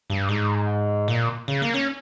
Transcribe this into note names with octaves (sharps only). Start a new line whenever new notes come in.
G2
G#2
A#2
C#3
A#3
C#4